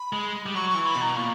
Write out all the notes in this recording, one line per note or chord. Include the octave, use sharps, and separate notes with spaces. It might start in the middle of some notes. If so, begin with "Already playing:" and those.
Already playing: B5
G#3
G3
F#3 C#6
C#6
E3
B5
B2
A#5
A#2 C#6